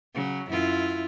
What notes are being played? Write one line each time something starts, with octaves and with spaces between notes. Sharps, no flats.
C#3 F#3
F#2 E4 F4